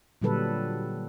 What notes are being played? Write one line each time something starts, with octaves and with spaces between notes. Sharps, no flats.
A#2 D3 F#3 G3 A4 B4